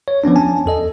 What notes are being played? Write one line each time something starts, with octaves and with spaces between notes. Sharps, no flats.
C#5
F3 B3 C#4 D4
G#5 A5
E2 A4 D#5